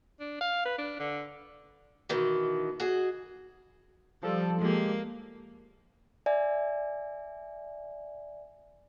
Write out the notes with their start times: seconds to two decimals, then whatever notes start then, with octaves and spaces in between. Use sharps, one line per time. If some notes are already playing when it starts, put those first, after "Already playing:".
0.20 D4
0.41 F5
0.65 B4
0.78 D4
1.00 D3
2.09 B2 D#3 E3
2.80 F#4 G#4 D#5
4.23 F3 G3 A4
4.61 G#3 A#3 G4
6.26 D5 E5 G#5